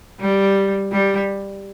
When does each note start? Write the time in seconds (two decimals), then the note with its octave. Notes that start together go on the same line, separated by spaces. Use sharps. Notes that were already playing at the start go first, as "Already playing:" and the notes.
0.20 G3
0.92 G3